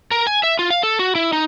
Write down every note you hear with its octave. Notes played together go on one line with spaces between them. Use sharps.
A#4
G#5
E5
F4
F5
A4
F#4
E4
D#4